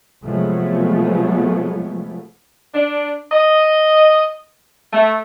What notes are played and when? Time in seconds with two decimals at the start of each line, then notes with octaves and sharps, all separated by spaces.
0.25 C3 F3 F#3 G#3 A3 B3
2.74 D4
3.32 D#5
4.93 A3